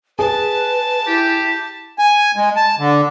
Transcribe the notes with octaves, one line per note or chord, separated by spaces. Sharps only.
G#4 B4 A5
E4 G4
G#5
G#3
A5
D3